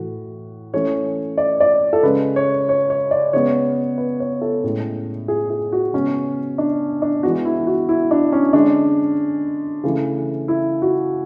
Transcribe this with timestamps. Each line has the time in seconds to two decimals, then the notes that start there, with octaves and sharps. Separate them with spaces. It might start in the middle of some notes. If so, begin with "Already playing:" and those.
Already playing: A2 E3 A3 F#4
0.74 E3 A3 C#4 C#5
1.38 D5
1.60 D5
1.93 A4
2.03 C#3 G#3 C#4 B4
2.36 C#5
2.69 C#5
2.90 C#5
3.11 D5
3.33 C#3 G#3 B3 C#5
3.98 B4
4.20 C#5
4.42 A4
4.64 A2 G#3 C#4
5.28 G#4
5.50 G#4
5.72 F#4
5.93 C#3 G#3 B3 C#4
6.58 D4
7.02 D4
7.23 E3 G#3 B3 F#4
7.45 E4
7.67 F#4
7.89 E4
8.11 D4
8.32 C#4
8.53 D3 G#3 C#4 D4
9.84 C#3 E3 A3
10.48 E4
10.82 F#4